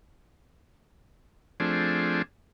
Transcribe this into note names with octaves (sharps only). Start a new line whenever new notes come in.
F3 A3 C4 D4 G#4